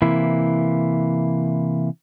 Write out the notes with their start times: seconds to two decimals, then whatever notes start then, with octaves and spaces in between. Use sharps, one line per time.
0.02 C3 E3 A#3 E4